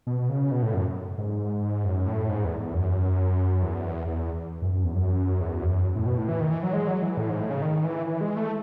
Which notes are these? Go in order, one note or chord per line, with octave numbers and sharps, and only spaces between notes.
B2
C#3
B2
A2
F#2
G#2
F#2
A2
G#2
E2
E2
F#2
E2
E2
F#2
F#2
E2
F#2
E2
F#2
A2
B2
A2
E3
D#3
E3
F#3
G#3
F#3
E3
A2
G#2
A2
C#3
D#3
E3
E3
G#3
A3